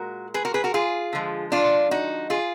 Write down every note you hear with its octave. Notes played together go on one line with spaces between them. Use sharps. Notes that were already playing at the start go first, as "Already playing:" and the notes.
Already playing: A#2 G#3 F#4 A#4
G#4 B4
F#4 A#4
G#4 B4
F#4 A#4
F4 G#4
D3 F3 G#3
D4 F4
D#4 F#4
F4 G#4